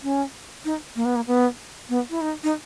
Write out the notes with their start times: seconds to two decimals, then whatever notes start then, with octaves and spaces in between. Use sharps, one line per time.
0.03 C#4
0.65 D#4
0.96 A#3
1.05 B3
1.16 A#3
1.27 B3
1.89 B3
2.10 E4
2.21 D#4
2.43 D#4